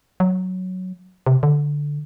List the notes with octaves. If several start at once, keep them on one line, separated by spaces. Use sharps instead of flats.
F#3
C3
D3